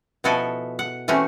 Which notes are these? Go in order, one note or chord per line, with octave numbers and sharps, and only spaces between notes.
B2 F3 E4 F#4 A4 G#5
F#5
E3 A3 C4 C#4 F#4